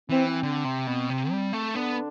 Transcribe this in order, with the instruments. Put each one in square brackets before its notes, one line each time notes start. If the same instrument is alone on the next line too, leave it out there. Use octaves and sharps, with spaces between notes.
[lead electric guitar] E3 [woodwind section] C4
[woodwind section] C4
[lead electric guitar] D3
C3
B2
C3
G3
A3
[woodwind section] D3 D4 [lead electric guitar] B3